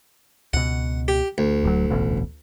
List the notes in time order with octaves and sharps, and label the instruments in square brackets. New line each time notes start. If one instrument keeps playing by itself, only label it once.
[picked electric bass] C#2 B2 [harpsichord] F#5
[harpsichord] G4
D2
[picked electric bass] D1 F#3
E1 A1 B2